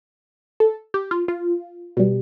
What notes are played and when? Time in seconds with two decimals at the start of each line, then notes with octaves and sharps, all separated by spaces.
0.60 A4
0.94 G4
1.11 F4
1.28 F4
1.97 B2 G3